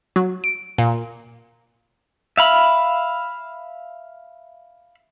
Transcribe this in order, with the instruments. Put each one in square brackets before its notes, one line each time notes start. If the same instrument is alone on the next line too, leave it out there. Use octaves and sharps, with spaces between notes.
[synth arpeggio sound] F#3
D7
A#2
[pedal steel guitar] E5 F5 B5